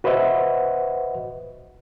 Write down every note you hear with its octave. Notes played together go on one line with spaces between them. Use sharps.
F#4 B4 C5 D#5 E5 F#5